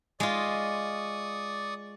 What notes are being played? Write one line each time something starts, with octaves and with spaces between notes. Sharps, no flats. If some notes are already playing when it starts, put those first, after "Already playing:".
G#3 F4 D5 C#6 D#6